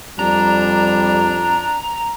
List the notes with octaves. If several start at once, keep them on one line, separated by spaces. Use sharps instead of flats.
F2 G3 D4 A#5